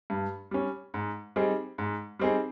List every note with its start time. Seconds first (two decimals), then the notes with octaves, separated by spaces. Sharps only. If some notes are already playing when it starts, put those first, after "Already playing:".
0.10 G2
0.51 G3 C#4
0.94 G#2
1.36 G3 C4 D#4 G#4
1.78 G#2
2.19 G3 C4 D#4 G#4